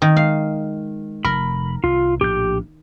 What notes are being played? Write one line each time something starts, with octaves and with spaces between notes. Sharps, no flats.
D#3
G#3 F5
F1 A#4 B5
C2 F4
A#1 A2 G4 G6